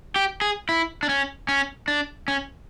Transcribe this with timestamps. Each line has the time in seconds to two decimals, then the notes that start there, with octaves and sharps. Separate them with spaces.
0.16 G4
0.41 G#4
0.69 E4
1.03 D4
1.09 C#4
1.48 C#4
1.88 D4
2.28 C#4